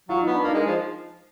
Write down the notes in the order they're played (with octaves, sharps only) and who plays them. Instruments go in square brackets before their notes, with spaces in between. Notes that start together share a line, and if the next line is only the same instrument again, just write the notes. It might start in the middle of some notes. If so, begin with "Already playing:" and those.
[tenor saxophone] F#3 [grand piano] F4
[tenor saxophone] B3 [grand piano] D#4
[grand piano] D4
[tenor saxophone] A#3
[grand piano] D#4
[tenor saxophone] G#3
F3